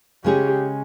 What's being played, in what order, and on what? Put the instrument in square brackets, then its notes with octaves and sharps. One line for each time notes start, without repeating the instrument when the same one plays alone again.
[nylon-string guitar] C#3 G#3 C#4 G#4 C#5 [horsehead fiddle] G4